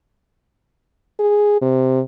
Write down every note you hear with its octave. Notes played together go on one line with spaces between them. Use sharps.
G#4
C3